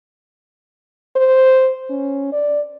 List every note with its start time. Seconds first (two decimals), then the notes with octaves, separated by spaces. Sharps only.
1.16 C5
1.90 C#4
2.33 D5